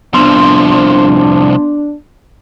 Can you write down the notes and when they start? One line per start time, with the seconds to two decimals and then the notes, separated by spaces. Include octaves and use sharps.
0.14 C2 F3 B3 D4 C6